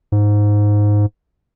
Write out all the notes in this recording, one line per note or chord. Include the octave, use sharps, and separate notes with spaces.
G#2